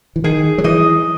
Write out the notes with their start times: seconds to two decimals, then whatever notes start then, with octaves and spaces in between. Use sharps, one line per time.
0.16 E3
0.24 D#3 G#4
0.58 F#3
0.64 E3 D#5